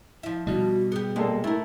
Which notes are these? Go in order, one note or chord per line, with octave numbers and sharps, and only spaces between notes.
F3 E4 E5
B2 G3 D#4 F#4
B3 G4 G#4
A#2 G#3 A#3 G4 A4
A3 E4 A#4